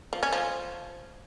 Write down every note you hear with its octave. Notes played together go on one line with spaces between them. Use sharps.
F3
C#4
F3